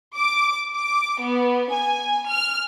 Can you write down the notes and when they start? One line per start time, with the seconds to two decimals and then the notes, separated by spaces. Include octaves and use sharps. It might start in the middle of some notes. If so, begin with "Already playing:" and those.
0.16 D6
0.75 D6
1.23 B3
1.72 G#5
2.29 F6